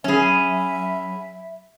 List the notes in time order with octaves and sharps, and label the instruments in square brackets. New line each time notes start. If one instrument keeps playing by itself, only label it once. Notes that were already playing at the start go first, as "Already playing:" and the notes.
[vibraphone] F#3 B5 [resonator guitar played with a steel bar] C#4 G#4 [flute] E5